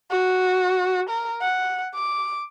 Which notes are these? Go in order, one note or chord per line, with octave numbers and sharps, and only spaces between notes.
F#4
A#4
F#5
D6